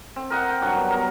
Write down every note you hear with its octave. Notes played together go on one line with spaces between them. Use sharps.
C4
A#4 C5 D#5 F#5
G5
G2 F#3 F#5 C#6
B3
B3 A#4